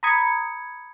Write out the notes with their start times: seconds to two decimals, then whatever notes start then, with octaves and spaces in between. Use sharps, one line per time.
0.03 A#5 B5 D#6 G#6 C#7